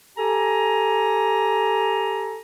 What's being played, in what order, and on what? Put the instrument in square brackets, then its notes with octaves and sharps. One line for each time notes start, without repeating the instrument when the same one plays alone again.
[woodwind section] G4 A4 G#5 A#5